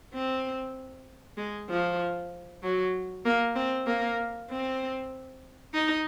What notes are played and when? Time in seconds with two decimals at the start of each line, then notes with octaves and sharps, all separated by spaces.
0.14 C4
1.37 G#3
1.69 F3
2.63 F#3
3.25 A#3
3.55 C4
3.87 A#3
4.50 C4
5.73 D#4